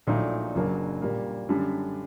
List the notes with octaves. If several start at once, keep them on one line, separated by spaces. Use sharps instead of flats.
A#1 A#2 F#3 A3 D#4
F#1 F#2 F#3 A#3 D4
A#2 G3 A#3
F#2 D3 G3 D4